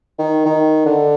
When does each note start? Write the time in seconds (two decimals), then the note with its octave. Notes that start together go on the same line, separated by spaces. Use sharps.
0.19 D#3
0.46 D#3
0.86 D3